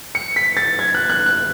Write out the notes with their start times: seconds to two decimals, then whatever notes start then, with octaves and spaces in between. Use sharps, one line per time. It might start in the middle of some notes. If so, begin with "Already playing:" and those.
0.15 C#7
0.36 B6
0.57 A6
0.79 G#6
0.94 F#6
1.10 F#6
1.26 F#6